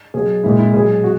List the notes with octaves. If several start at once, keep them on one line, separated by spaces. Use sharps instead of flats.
B2 F#3 G#4
A#2 G#3 E4
E4
B2 F#3 G#4
F#4